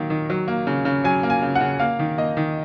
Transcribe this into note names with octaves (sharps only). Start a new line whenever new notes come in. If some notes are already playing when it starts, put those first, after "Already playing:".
Already playing: D#3 F#3 A#3
D#3
F#3
A#3
C#3
C#3
F#3 G#5
A#3
G#5
C#3
F#5
C#3
A#3 F5
D#3
A#3 D#5
D#3